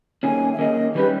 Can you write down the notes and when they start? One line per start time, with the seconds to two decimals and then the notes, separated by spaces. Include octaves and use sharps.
0.23 D#3 A#3 C#4 G#4 G#5
0.53 E5
0.59 D#3 A#3 C#4 G#4 D#5
0.94 D#3 G3 C#4 G4 B4